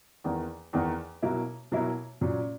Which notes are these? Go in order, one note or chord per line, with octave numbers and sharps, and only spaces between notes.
E2 D#3 A#3
E2 D#3 A#3
B2 F#3 A#3 E4
B2 F#3 A#3 E4
A#2 F#3 C#4